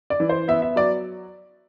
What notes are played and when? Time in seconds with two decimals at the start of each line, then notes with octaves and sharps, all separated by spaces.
0.10 D5
0.20 E3
0.29 C5
0.48 B3 E5
0.62 E5
0.76 F#3 D5